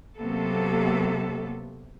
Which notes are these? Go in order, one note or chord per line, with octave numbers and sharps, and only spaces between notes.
C3 F#3 A#3 B3 A4